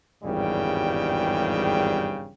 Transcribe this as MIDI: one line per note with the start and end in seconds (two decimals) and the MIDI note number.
0.24 2.32 32
0.24 2.32 40
0.24 2.32 43
0.24 2.32 49
0.24 2.32 55
0.24 2.32 79